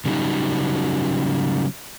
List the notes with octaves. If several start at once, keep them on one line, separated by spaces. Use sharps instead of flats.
C#3 F#3 G3 A#3 D#4 F#4